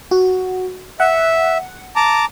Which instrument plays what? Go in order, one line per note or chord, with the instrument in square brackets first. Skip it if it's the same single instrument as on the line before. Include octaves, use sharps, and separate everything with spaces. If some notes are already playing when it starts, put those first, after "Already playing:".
[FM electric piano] F#4
[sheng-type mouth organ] E5 [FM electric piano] F#5
[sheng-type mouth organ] A5 A#5 D6